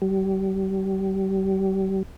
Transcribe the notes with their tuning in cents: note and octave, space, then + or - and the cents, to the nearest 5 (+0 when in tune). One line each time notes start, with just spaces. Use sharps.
G3 -35